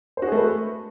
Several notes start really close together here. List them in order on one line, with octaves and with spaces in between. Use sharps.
C5 F#4 G#4 A3 B4